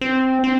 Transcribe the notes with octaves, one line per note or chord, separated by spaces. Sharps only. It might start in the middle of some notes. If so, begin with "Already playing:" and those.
C4
C4